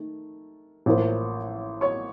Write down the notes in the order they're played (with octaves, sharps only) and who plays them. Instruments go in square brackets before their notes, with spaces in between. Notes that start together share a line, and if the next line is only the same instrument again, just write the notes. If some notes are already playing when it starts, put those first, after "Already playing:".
Already playing: [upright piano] D#3 A3
A1 A2 F3 A#3
C#5 C#6